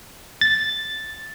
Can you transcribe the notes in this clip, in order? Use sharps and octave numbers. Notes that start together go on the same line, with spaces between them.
A6